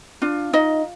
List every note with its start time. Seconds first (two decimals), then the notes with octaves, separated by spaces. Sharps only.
0.22 D4 F4
0.53 D#4 D#5